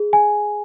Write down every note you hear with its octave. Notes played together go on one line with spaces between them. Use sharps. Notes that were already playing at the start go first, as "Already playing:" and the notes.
Already playing: G#4
G#5